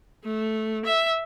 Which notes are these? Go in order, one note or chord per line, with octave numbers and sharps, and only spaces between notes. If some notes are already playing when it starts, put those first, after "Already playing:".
A3
E5